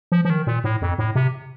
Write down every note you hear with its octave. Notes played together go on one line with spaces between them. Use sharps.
F3
F3
D#3
A#2
A2
F2
A2
C3